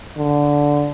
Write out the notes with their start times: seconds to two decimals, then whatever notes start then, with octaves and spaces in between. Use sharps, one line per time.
0.18 D3